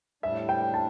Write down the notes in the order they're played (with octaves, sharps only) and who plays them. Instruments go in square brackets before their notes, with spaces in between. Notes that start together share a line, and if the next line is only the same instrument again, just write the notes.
[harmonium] A2 G3 D4 [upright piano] E5
[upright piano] G5
A5